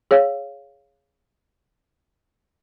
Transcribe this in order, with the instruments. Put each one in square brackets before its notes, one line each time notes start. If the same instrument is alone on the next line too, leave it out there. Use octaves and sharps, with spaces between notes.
[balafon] G#4 C#5 F5